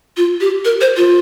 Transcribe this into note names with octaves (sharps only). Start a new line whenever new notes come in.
F4
G4
A#4
C5
F4